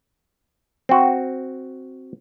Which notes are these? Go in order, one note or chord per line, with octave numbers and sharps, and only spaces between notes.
C4 F#4